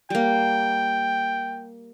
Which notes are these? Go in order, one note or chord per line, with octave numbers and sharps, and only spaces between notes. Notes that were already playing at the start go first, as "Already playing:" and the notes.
G3 A#3 G5